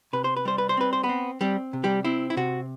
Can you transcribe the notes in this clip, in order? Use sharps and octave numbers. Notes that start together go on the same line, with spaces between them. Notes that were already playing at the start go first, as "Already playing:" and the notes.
C3 B4
C5
B4
G3 C5
B4
C5
C4 B4
C5
B3 B4
C4
G3 C4 G4
C3
G3 G4
C4 E4
E4
C3 F#4